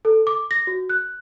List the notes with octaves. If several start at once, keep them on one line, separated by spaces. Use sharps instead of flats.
A4
D6
A#6
F#4
F#6